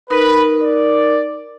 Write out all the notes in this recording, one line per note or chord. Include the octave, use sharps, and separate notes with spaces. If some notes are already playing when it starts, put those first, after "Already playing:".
D#4 A#4 B4
D5